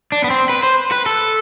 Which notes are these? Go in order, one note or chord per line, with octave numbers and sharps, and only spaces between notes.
D4
B3
C4
B4
C5
B4
A4